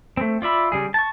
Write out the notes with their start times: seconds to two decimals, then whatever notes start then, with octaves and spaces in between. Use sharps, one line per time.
0.17 A3 C4
0.42 F4 D5 E5 B5
0.72 C#3 G3 G#4
0.94 A5 C#6